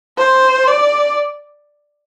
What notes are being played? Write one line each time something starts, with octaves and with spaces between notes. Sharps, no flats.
C5
D5